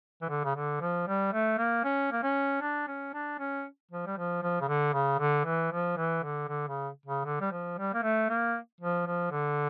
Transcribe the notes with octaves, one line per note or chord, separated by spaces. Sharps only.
E3
D3
C#3
D3
F3
G3
A3
A#3
C#4
A#3
C#4
D4
C#4
D4
C#4
F3
G3
F3
F3
C#3
D3
C#3
D3
E3
F3
E3
D3
D3
C#3
C#3
D3
G3
F3
G3
A#3
A3
A#3
F3
F3
D3